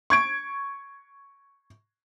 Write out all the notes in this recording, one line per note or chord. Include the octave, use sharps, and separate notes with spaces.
C#6 G#6 D7